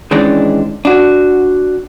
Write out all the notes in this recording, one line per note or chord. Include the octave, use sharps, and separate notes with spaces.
D#3 E3 G#3 C#4 D4
D4 F#4